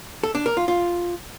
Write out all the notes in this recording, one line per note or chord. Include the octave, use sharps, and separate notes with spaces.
A4
D4
A#4
F4
F4